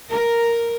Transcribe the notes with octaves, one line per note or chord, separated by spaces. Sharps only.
A#4